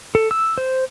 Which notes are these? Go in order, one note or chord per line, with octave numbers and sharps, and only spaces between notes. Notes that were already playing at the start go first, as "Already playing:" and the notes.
A4
E6
C5